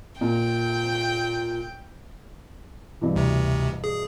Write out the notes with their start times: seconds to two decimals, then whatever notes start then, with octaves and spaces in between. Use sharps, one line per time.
0.21 A#2 G5
3.01 G2 B2 E3
3.16 D2 C3
3.84 G#4